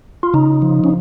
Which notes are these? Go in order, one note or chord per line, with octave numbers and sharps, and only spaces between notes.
F4
C#3 D#4
F3
C#4